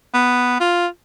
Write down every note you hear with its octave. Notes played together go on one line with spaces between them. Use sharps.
B3
F4